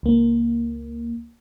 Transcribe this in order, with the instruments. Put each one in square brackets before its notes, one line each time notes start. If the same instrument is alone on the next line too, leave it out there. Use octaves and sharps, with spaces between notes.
[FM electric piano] C#2 A#3